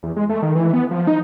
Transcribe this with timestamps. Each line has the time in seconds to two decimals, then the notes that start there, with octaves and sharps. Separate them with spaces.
0.03 E2
0.16 G#3
0.29 A3
0.42 D#3
0.55 E3
0.73 B3
0.91 F3
1.07 D#4